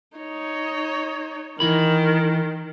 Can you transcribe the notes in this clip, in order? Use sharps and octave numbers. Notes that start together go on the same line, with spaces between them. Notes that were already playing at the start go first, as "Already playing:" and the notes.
D#4 C#5
D#3 E3 E4 B5